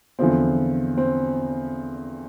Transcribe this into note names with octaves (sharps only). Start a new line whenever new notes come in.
E2 D3 F3 C4
C4